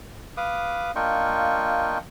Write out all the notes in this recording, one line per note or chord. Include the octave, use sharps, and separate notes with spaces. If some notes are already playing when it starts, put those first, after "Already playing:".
B4 F5 D6 D#6
A#3 D4 F4 D#5 G5 C#6